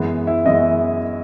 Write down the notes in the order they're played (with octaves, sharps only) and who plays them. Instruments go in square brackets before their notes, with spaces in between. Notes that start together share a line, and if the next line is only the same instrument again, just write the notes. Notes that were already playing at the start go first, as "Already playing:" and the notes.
Already playing: [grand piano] F#2 E3 G#3 B3
E4
F#2 E3 G#3 B3 D#5